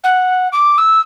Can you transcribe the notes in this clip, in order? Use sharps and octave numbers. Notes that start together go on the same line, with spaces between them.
F#5
D6
E6